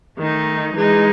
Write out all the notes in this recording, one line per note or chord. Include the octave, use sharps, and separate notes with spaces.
D#3 A3 D#4
E3 G#3 D#4 G#4